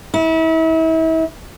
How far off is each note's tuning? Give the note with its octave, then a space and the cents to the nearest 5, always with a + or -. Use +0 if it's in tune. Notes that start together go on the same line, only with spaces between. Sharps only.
E4 -35